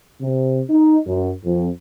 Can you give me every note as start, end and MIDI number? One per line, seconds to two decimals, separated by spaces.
0.22 0.62 48
0.70 0.99 63
1.07 1.32 42
1.45 1.69 41